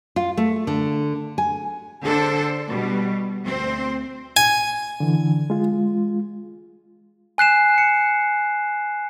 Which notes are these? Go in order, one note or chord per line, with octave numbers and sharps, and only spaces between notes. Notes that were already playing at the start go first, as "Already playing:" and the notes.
F4
A3
D3
G#5
D3 D4 A4 C5
B2 G3
D2 C4 C5
G#5
D3 E3
G#3 F4
G#5 F#6 C7 E7
C#7